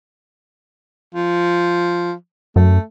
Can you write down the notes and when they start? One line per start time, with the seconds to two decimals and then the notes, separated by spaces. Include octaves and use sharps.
1.15 F3
2.56 F#2 A3